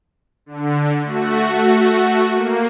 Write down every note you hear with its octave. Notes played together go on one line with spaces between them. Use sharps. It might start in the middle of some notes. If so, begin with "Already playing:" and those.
D3
A3 F#4
A#3